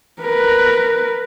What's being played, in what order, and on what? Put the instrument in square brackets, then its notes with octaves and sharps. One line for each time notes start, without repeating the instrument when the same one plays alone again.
[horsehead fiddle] A#4 B4